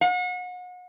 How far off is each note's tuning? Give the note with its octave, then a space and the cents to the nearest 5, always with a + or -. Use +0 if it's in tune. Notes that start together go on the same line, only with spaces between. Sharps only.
F#5 -35